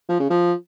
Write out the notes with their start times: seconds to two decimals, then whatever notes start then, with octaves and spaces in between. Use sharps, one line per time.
0.09 F3
0.20 C#3
0.30 F3